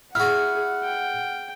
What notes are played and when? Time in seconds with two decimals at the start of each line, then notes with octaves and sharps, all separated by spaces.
0.15 E4 F#4 G#4 F#5 F6
0.83 G5